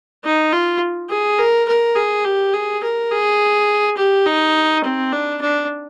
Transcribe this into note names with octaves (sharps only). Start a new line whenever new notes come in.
D#4
F4
G#4
A#4
A#4
G#4
G4
G#4
A#4
G#4
G4
D#4
C4
D4
D4